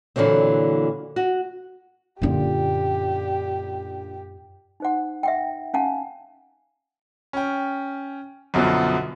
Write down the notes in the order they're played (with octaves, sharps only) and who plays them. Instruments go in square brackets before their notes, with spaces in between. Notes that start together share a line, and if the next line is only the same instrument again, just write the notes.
[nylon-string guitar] A#2 D3 E3 F#3 C4
F#4
[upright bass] F#2 F4 [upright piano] A#2 D3 [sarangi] G4
[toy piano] D#4 C5 F#5
E5 F#5 G5
C#4 F5 F#5 G#5 A5
[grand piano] C#4 G5
B1 F#2 B2 D3 F3 B3